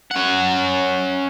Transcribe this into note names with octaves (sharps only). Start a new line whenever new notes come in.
C#4 F#5